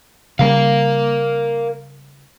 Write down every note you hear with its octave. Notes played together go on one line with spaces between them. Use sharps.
C#3 G3 A#4 F5